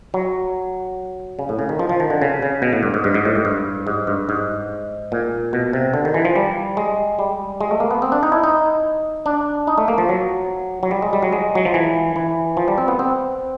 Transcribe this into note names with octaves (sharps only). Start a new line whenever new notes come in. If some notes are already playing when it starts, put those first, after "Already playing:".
F#3
C#3
A2
C#3
D#3
F3
F3
D#3
D3
C#3
C#3
B2
A2
G2
G#2
G2
G#2
A2
G#2
G2
G#2
G2
G#2
A#2
B2
C3
D3
D#3
E3
F3
G3
G#3
G3
G#3
A3
A#3
B3
C4
D4
D#4
E4
D#4
D4
D#4
A3
A#3
F3
F#3
F#3
G3
G#3
G3
F#3
G#3
F#3
F3
E3
E3
F3
G3
C4
B3
C4